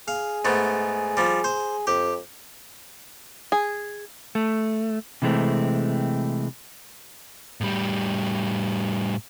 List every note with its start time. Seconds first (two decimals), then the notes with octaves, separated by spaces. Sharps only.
0.08 G#4 F5
0.45 G#2 A3 B3
1.17 F3 G3
1.44 C5
1.87 F2 G4
3.52 G#4
4.35 A3
5.22 C3 E3 G#3 A3 C4
7.61 A2 G3